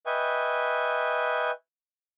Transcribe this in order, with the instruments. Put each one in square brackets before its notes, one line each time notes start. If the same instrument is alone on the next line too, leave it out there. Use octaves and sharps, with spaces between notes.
[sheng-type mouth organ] B4 D#5 E5 G5 G#5 C#6